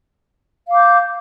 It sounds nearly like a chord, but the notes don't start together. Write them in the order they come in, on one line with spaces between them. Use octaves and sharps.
F5 D6 G6